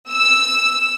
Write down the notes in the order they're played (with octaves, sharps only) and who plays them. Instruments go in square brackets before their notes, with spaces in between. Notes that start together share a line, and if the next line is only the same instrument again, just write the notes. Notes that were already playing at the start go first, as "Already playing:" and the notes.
[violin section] E6